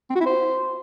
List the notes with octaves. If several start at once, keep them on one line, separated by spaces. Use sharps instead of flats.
C4
F#4
E4
C5